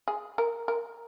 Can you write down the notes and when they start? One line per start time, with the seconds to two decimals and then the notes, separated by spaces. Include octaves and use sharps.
0.08 G#4
0.38 A#4
0.68 A#4